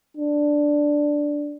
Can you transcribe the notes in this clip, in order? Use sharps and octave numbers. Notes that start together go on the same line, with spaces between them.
D4